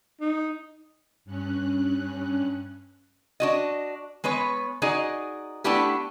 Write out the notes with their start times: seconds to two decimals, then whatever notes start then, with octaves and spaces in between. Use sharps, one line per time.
0.21 D#4
1.25 G2 C#4 F#6
3.40 D4 F#4 D#5
4.24 G#3 B3 B4 C#5
4.82 D#4 F#4 G#4 D5 D#5
5.64 A3 B3 D4 E4 G4 B4